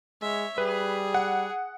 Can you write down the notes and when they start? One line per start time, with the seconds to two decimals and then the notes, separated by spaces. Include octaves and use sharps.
0.22 G#3 C#5 E5
0.58 G3 G#4 B4
1.14 F#5